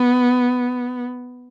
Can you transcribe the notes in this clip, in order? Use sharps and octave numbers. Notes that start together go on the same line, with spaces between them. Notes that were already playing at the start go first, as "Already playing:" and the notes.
Already playing: B3